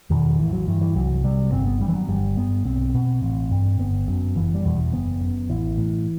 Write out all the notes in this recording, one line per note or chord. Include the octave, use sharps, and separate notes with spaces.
E2 B2 D#3
A1 E3
F#3
G2 E3
E3
C2 F#3
C3 G3
G1 C4
B3
G2 G3
E3
F#3
G1 G3
G2 B3
B1 C4
B2
A1
G2
G1 B3
F#2
F#1 E3
G3
E2 B2
F#1 B3
F#2
A1 E3
A2